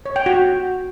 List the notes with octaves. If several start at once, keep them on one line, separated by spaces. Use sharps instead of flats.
C#5
G5
F#4